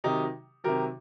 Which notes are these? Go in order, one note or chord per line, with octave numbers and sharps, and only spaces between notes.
C3 D#3 F#3 D#4 G4
C3 D#3 F#3 G4 A#4